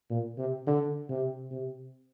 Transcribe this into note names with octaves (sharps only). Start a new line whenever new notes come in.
A#2
C3
D3
C3
C3